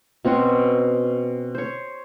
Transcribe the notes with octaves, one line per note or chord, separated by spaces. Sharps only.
B2 C4 C#4 F#4
C5 C#5